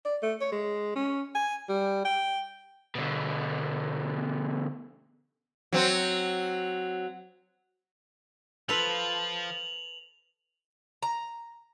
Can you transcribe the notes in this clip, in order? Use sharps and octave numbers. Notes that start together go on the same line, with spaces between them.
D5
A3
C#5
G#3
C#4
G#5
G3
G5
B2 D3
F#3 C4
F3 F4 A4 B4 F7 F#7
A#5